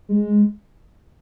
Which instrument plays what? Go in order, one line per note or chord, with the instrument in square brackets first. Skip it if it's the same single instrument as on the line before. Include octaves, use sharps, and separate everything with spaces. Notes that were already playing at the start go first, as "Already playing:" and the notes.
[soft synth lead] G#3